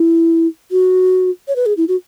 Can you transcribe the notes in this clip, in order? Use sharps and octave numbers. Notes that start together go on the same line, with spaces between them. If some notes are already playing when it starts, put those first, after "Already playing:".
Already playing: E4
F#4
C#5
B4
G#4
E4
F#4